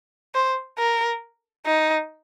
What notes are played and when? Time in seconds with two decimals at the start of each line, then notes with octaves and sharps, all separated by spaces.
0.35 C5
0.78 A#4
1.66 D#4